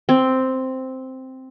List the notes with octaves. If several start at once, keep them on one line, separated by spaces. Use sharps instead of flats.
C4